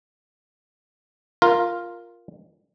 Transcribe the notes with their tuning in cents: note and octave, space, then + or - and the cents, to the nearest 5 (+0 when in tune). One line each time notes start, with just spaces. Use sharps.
F4 +0 A#4 +0